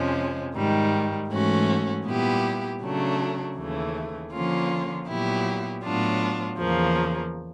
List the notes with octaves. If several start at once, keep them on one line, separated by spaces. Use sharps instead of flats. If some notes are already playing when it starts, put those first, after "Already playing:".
Already playing: F2 C3 F3 G#3 C#4
G#2 D#3 G3
G#2 E3 A3 C#4 F#4
A#2 G3 B3 E4 G4
C#3 F#3 A3 D4
D#2 C#3 E3 A3
D3 F3 A#3 C#4 F4
A#2 F#3 B3 E4 G4
A2 F#3 B3 D4 F4
E2 C#3 F3 A#3